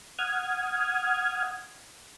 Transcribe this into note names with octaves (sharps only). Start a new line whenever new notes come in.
F#5 D#6 F6 G#6